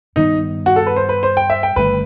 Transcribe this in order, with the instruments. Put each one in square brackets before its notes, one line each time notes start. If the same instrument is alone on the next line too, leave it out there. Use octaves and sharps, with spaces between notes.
[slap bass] G2 D#3 G3 B3 [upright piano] D#4
[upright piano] F#4
A4
B4
C5
B4
C5
G5
E5
G5
[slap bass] G1 G2 D#3 A3 [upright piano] B4